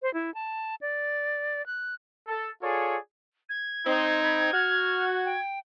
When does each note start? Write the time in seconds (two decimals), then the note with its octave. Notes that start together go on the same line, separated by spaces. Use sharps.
0.02 C5
0.14 E4
0.34 A5
0.81 D5
1.66 F#6
2.28 A4
2.62 F4 G#4 A4 C#5 D5
3.49 G#6
3.86 C4 D#4 C5
4.23 B5
4.53 F#4 F6
5.25 G5